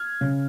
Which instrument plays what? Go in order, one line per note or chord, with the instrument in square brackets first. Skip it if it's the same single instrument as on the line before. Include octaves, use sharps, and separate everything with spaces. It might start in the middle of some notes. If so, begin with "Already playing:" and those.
Already playing: [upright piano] F6 G#6
C#3